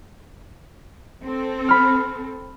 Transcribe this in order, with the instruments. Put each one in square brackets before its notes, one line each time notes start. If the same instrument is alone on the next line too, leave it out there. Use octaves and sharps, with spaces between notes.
[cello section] C4 A4
[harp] B5 F6